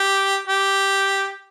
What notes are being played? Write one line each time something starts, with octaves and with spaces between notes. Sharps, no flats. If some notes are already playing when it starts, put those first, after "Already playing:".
Already playing: G4
G4